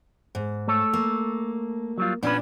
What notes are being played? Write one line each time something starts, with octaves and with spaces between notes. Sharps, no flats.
G#2
A3 A4 C#5
A#3
F#3 G3 F4
A#2 B3 C#4 D4 B4